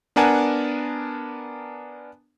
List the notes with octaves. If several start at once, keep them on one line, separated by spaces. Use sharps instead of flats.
B3 D4 A#4 F#5 G#5 A5